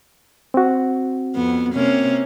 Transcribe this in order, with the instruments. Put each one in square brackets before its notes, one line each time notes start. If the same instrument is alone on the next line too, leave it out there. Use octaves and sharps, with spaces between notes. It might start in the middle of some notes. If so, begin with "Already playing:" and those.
[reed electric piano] C4 F#4
[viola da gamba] F2 B3
C3 A#3 C#4